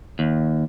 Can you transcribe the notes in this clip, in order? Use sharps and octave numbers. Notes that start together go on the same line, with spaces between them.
D#2